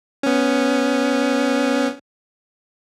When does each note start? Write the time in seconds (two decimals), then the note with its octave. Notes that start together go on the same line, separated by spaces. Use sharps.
0.23 B3 C#4